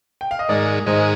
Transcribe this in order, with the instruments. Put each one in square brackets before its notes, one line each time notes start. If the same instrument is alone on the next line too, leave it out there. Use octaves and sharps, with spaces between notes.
[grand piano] G5
F5
D#5
[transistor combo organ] G#2 D#3 G#3 [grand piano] A#4 D5
[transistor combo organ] G#2 D#3 G#3 [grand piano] C5 D#5